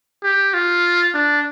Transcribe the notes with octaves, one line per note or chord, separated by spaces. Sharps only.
G4
F4
D4